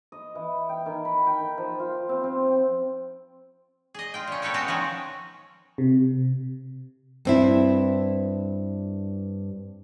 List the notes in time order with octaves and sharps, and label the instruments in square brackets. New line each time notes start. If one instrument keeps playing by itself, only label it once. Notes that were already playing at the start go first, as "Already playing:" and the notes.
[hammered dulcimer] D#5
E3
G5
D#3
B5
G5
D#3
F3
F4
C4
C4
G5
[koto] G#4 D#5
F4 G5
A#2 C#4
C#4 A4 B4 C#5 G5
G#3 B3 F#4 F5 G5
D#3 F3 G#3 C#4
[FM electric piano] C3
[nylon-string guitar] G2 C4 E4